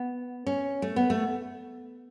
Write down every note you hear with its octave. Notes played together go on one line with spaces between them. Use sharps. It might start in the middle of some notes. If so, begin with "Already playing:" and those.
Already playing: B3
C#4
A3
B3
A3